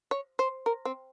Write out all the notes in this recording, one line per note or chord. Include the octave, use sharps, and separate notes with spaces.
C#5
C5
A#4
C4